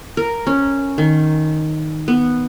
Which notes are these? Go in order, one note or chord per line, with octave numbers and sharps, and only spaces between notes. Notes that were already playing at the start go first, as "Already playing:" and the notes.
A#4
C#4
D#3
B3